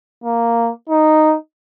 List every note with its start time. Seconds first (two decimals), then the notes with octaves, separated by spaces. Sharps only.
0.24 A#3
0.89 D#4